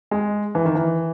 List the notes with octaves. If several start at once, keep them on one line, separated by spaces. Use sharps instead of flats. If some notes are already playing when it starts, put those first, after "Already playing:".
G#3
E3
D#3
E3